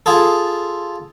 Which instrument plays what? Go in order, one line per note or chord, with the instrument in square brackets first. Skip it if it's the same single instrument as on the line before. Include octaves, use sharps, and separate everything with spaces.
[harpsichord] F4 G#4 A4